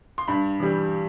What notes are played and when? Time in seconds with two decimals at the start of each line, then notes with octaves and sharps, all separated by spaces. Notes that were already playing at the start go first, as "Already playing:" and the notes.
0.18 C6
0.28 G2 B5
0.60 E3 G3